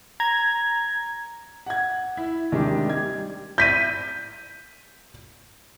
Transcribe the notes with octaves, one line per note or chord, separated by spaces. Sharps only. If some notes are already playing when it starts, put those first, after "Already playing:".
A#5 G#6
F#5 G#6
E4
C3 D#3 G3 G#3 D4
G3 G#6
G6 B6 D#7